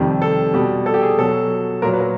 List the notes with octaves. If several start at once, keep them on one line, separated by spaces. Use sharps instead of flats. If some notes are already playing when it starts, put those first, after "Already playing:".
Already playing: F2 C3 D#3 G3
A4
B2 G3
A4
G4
G#4
B2 F#3 A4
A#2 F#3 A#4
B4
A#4